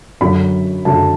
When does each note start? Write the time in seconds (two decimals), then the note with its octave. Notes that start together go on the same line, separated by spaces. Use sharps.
0.21 F#2 D3 F#3 B5
0.85 F#2 D3 F#3 A5